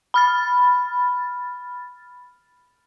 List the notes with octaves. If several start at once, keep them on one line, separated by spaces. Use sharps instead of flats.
B5 F6 A6